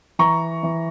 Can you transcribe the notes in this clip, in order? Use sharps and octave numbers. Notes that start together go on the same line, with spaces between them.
E3 A#5 C#6
E3